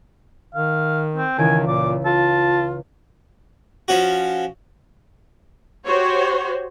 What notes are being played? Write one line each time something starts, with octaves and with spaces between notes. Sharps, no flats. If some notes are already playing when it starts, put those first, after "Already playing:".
D#3 F5
C4
C#2 D#3 E3 G#5 D7
A#2 D6
F4 A5
F3 C#4 F#4
F#4 G4 C5 C#5